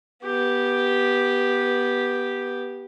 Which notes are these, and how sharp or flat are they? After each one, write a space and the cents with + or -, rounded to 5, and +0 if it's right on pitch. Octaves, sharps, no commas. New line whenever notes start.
B3 -15 G4 +0